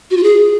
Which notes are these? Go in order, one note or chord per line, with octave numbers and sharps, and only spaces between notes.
F#4
F4
G#4